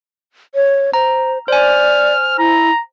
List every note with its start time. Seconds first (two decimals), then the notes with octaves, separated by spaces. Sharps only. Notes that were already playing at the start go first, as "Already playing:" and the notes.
0.55 C#5
0.93 C5 A#5
1.48 C5 D5 G#5 F6
2.39 E4 A#5